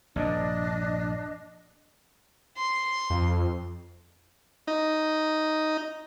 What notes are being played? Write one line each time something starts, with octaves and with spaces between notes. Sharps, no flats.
A#1 G2 C3 D4 D#5
C6
F2
D#4